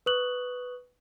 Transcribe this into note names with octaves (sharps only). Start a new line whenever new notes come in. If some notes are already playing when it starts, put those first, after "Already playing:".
B4 C#6 D#6 F#6 F#7